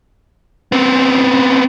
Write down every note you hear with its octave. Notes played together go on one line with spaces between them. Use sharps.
B3 C4